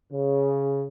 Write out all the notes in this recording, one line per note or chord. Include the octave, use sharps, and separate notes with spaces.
C#3